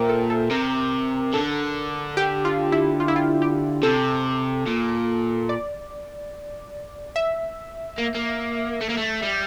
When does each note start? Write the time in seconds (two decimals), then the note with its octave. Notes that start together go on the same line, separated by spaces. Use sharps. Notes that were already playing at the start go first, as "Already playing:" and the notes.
Already playing: A#2 A#4 C5 E5 G5
0.09 A4
0.30 A4
0.50 C3 A#4
1.34 D3 A4
2.17 G4
2.45 F4
2.72 E4
3.00 F4
3.08 E4
3.16 F4
3.42 G4
3.83 C3 A4
4.66 A#2
5.49 D5
7.16 E5
7.98 A#3
8.14 A#3
8.81 A3
8.90 A#3
8.98 A3
9.23 G3